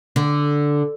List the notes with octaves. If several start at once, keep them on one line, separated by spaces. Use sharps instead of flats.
D3